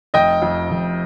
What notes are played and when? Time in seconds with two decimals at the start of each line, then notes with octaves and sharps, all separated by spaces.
0.14 F1 D#5 G5
0.42 F2
0.71 F1